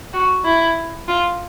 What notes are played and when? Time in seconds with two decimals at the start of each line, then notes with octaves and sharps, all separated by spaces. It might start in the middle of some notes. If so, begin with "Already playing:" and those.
0.14 F#4
0.45 E4
1.08 F4